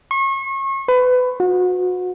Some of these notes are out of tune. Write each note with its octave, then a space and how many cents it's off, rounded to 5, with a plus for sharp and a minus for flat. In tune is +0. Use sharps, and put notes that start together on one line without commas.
C#6 -35
B4 +25
F#4 -30